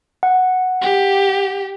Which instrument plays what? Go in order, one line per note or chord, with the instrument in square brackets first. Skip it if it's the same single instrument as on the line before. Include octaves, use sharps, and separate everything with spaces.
[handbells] F#5
[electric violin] G4